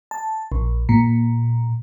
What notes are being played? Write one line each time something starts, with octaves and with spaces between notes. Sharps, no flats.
A5
A#1
A#2